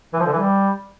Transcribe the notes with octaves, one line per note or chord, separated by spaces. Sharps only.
E3
F3
D3
E3
G3